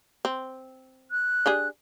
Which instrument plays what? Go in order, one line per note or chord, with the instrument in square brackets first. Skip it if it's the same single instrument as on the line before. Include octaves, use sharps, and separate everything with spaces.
[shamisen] C4
[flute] F#6
[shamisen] D4 G4 G#4